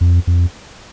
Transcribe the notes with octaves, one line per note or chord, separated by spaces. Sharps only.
F2
F2